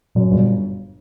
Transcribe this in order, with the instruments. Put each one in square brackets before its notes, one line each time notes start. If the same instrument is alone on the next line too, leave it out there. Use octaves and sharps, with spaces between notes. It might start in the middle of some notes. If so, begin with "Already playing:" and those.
[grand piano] F#2 [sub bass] A#2
[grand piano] G1